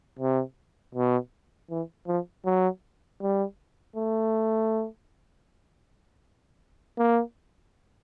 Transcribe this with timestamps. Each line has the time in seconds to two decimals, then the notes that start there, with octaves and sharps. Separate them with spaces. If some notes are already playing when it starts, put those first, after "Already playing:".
0.19 C3
0.95 B2
1.70 E3
2.07 F3
2.45 F#3
3.21 G3
3.96 A3
6.98 A#3